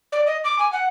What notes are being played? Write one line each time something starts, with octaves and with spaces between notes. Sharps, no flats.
D5
D#5
D6
G#5
F#5